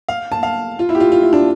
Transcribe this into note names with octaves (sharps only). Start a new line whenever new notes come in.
F5
A5
F5
F4
E4
G4
F4
F4
E4
D4